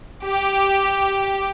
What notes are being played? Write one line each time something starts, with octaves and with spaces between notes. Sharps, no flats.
G4